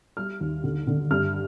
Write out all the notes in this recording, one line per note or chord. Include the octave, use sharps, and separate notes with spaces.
G3 F6
D#2
D3
D3
G2 F6